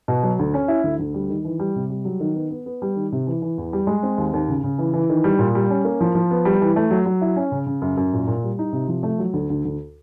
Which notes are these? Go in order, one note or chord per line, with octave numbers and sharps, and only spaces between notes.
B2
F#3
D2
C#4
E4
D2
D2
G3
D#3
E3
G3
C3
G3
F#3
D#3
B3
B3
B3
G3
D#3
C3
E3
E3
E2
G3
G#3
C4
D#2
D#2
C#3
C#3
E3
E3
D#3
G3
A#2
G3
C#4
A#3
F3
F3
B3
G3
E3
A3
F#3
F#3
E4
C#4
C#3
C#3
F#2
F#2
A#2
A#2
G3
D#4
C3
F3
A3
F#3
D2
D2
D2